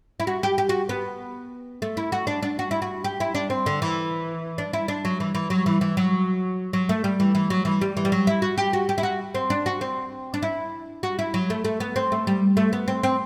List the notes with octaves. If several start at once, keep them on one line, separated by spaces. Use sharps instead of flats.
E4
F#4
G4
G4
F#4
B3
A3
E4
F#4
D4
D4
F#4
E4
F#4
G4
E4
D4
C4
D3
E3
D4
E4
D4
F#3
E3
E3
F#3
E3
E3
F#3
F#3
A3
G3
E3
E3
F#3
E3
G3
E3
G3
F#3
E4
F#4
G4
F#4
G4
E4
F#4
C4
D4
F#4
C4
D4
E4
F#4
E4
F#3
A3
A3
B3
C4
A3
G3
A3
B3
C4
C4